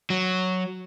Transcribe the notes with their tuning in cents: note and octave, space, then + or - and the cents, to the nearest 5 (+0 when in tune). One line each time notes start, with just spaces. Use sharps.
F#3 +0